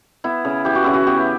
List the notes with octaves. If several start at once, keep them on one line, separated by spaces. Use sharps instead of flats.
B3 E4
C#3
E3 G4
F#4
C#3 E4
F#4
B3 G4